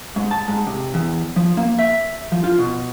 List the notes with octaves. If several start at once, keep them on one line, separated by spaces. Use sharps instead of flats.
G#2
A5
G#2
C3
E2
F3
A#3
E5
F3
F4
B2